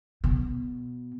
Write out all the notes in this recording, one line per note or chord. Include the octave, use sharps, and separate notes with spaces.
B2